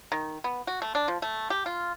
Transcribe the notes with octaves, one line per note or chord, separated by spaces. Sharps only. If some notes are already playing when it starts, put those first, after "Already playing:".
D#3
B3
F#4
A3
D4
F3
A3
G4
F4